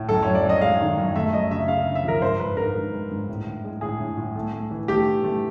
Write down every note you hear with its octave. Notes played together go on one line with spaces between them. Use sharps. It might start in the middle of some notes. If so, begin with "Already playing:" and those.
Already playing: A2
F#2 A4
F#2 C#5
D5
F#2
D#5
G#3 F5
D#3
F#2
A3 E5
F#2 D#5
C#3 E5
C#3 F5
C#3
E5
F3 A#4
G#2 C5
G#2 B4
G#2 A#4
G#2
G#3
G#2
A2
A2
G#3
A2 G#4
A2
A2
A3
A3
E3
A3 G4
E3
A3